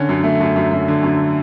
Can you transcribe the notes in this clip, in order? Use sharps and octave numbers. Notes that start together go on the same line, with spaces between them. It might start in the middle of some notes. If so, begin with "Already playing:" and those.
Already playing: D3 C#4
F#2
A3
F#2
F#2
F#2
D3
F#2